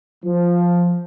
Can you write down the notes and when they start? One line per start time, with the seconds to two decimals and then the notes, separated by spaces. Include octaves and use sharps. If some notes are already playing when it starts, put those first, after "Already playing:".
0.24 F3